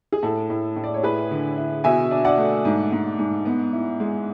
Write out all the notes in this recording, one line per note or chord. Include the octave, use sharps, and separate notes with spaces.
G#4
A2 A4
A2
A2
D5
C#5
E4 G#4 B4
D3
E4
B2 E5 G#5
D4
D5 F#5
A3
G#2
G#2
G#2
B3
E4
G#3